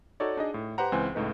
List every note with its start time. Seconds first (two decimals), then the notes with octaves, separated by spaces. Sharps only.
0.20 D#4 F#4 A4 C#5 D5
0.37 D4 D#4 G#4 D#5
0.54 A2
0.78 G4 B4 C5 F#5 A#5
0.92 C#2 E3 C4 C5 G#5 F#6
1.15 C#2 A2 D#4 B4